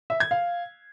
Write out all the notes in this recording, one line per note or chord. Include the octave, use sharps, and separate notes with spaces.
E5
G#6
F5